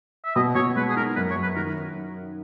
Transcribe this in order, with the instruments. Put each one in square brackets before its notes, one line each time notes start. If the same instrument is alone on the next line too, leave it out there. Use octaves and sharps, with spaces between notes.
[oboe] E5
[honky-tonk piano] B2 [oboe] D#5
[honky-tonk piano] B2 [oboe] C#5
[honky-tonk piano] G#3 [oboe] B4
[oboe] G#4
[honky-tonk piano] D#4 [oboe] A#4
[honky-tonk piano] F#2 [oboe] B4
[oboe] C#5
[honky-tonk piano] F#2
[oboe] B4
[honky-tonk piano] D#3 [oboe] A#4